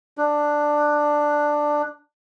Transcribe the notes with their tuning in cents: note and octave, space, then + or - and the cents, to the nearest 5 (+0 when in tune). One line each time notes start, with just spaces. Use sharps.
D4 +10